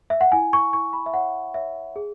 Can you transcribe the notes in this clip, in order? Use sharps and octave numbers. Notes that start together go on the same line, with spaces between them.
E5
F#5
E4 G#5
C#6
E4 C#6
B5
E5
C#5 F#5
C#5 E5
G#4